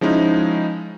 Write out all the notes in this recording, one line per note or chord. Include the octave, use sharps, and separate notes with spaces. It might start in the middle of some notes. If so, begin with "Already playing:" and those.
F3 G#3 C#4 D#4 E4